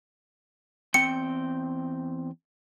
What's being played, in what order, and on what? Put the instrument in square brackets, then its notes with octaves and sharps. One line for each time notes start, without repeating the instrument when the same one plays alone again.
[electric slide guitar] E2 C4 G5 [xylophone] C#7